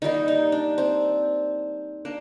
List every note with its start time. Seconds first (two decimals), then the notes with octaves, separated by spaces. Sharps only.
0.02 D#3 G3 A#3 D#4
0.28 D#4
0.52 D4
0.78 C4
2.05 A#3 D4